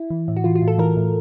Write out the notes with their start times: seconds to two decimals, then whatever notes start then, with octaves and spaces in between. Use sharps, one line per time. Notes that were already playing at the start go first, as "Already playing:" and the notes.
Already playing: E4
0.10 E3
0.28 A2
0.36 F#4
0.44 E3 F4
0.55 F4
0.62 A2
0.68 A4
0.78 E3 A#4
0.96 A2